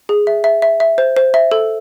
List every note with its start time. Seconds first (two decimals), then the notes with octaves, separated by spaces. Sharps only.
0.09 G#4
0.27 E5
0.44 E5
0.62 E5
0.80 E5
0.98 C5
1.17 C5
1.34 E5
1.52 A4